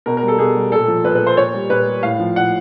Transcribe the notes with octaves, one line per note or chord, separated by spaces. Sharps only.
B2 A#4
A#4
G3
A4
B2 G#4
G3
A#2 A4
F3
A#2 B4
B4
F3
C5
A#2 C#5
G3
A#2 B4
G3
A2 F5
F3
A2 F#5